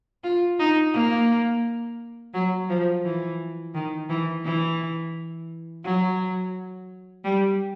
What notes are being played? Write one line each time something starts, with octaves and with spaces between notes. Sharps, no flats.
F4
D#4
A#3
F#3
F3
E3
D#3
E3
E3
F#3
G3